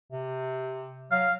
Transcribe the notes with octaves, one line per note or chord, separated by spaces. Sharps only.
C3
F#3 F5